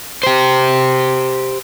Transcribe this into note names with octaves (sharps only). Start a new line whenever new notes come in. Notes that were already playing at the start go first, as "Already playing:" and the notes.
G4 C5